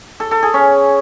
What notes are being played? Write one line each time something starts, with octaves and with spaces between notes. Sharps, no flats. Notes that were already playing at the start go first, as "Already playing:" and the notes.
A4
A4
G#4
C#4